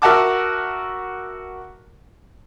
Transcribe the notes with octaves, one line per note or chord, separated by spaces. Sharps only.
F#4 A#4 E5 F#5 A5 D6